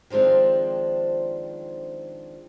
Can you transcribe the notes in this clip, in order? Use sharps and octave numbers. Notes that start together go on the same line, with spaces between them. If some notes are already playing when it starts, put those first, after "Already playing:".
D#3 F3 G#3 C4 D4